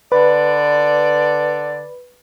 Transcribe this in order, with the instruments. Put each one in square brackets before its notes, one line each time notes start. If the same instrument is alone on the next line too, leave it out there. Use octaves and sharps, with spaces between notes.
[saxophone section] D3 D5 [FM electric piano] B4